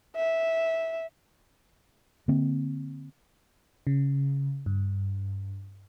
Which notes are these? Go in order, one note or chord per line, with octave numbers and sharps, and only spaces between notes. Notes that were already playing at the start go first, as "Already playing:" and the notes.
E5
D3 A#3 C4
C#3
G2